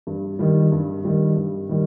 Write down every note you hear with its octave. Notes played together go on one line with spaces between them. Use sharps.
G2
D#3 G3
G2
D#3 G3
G2
D#3 G3